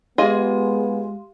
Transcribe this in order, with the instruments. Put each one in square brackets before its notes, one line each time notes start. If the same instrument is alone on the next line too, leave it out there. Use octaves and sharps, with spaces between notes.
[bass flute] G#3 [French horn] B3 [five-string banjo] F4 G#4 D#5 [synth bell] G4 F5 C6